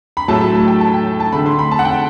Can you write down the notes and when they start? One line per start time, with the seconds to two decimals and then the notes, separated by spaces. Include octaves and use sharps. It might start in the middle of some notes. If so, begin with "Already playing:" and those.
0.17 B5
0.28 A2 F#3 A3 A5
0.41 B5
0.54 A5
0.67 G5
0.81 A5
0.93 G5
1.06 G5
1.20 A5
1.32 D3 A3 B5
1.46 C6
1.59 B5
1.71 A5
1.79 F#5
1.85 G5